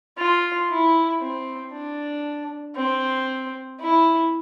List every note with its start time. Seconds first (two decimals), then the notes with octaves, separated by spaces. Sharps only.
0.18 F4
0.69 E4
1.21 C4
1.73 D4
2.76 C4
3.80 E4